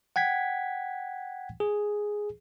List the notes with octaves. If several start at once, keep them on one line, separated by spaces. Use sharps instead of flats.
F#5 G5 G#6 B6
G#4